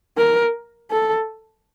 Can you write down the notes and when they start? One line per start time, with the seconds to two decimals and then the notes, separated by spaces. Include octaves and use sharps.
0.18 A#4
0.91 A4